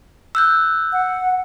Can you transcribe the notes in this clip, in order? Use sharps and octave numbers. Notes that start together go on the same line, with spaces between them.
E6 F#6 G6
F#5